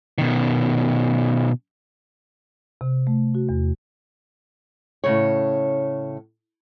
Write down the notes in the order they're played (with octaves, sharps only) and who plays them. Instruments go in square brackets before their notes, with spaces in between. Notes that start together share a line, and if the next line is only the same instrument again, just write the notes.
[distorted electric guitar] B2 D#3
[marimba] C3
A3
F#4
E2
[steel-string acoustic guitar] A2 C#3 C#5